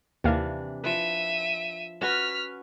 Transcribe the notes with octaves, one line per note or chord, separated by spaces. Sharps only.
D#2 C3 E3 A#3 D4 F5
F3 B4 E5 D#7
C#4 F#4 B4 F6 B6